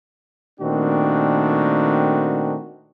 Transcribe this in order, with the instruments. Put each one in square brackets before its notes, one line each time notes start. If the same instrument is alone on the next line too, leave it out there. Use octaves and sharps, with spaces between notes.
[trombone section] A#2 D#3 A3 C4 D4 F#4